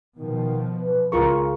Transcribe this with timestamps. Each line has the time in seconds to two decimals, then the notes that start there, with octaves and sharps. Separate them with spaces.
0.18 B2 D#3 F3
0.81 B4
1.12 C#2 F4 G#4 A#4 C#6